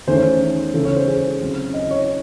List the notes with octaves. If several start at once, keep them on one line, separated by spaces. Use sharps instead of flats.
E2 D#3 A3 C#4 C5
C#2 C#3 E3 A4
C#5
C5
G#4
C#3 F#3 C4
D#5
C#5